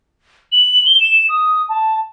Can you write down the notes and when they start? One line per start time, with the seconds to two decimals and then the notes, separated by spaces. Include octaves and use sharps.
0.52 F#7
0.86 G7
1.00 E7
1.29 D#6
1.69 A5